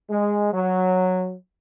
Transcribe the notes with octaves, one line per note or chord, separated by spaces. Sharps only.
G#3
F#3